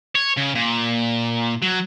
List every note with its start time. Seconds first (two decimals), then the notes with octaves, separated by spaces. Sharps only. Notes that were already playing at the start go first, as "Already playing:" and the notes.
0.15 C#5
0.37 C#3
0.55 A#2
1.62 F#3